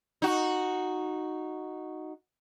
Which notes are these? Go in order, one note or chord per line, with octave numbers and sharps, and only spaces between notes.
D#4 F#4